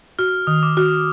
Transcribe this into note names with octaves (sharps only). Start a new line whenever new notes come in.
F#4 F6
D#3 D#6
D6
F#4 F6
F6